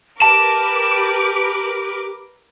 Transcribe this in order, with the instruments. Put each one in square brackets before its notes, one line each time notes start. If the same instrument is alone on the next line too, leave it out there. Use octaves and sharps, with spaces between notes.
[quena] G4 [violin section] A#4 B4 D6 [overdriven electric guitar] A5